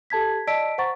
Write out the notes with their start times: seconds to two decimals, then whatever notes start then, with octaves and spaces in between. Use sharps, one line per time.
0.10 G4 A4 A5 G#6 B6
0.47 D5 D#5 A5 E6 B6 D7
0.78 C5 F#5 A#5 C#6 A6